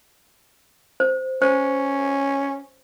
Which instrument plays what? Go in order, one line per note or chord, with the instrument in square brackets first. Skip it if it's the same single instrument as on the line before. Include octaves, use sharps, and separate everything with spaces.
[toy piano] C5
[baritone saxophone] C#4 [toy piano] C5